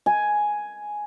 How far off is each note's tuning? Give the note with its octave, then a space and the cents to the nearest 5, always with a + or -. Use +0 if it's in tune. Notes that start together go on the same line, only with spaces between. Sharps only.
G#5 +5